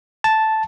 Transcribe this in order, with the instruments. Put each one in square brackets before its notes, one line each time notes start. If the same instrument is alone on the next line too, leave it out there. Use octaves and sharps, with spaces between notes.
[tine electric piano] A5